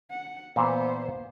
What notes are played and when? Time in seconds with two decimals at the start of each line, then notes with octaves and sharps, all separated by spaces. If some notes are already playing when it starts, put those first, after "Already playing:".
0.10 F#5
0.56 A#2 E3 B3 C5